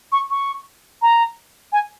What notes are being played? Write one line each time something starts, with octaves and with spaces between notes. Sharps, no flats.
C#6
C#6
A#5
G#5